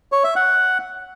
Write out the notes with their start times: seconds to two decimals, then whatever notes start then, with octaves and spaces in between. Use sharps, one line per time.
0.12 C#5
0.24 E5
0.36 F#5